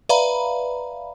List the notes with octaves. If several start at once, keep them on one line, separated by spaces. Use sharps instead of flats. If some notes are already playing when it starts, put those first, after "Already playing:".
B4 D5 E5 F5 A#5 B5